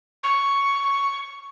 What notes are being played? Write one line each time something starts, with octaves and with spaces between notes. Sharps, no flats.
C#6